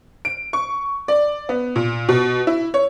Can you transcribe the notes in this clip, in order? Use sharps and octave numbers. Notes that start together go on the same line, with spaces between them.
D7
C#6
D5
B3
A#2
B2
E4
C#5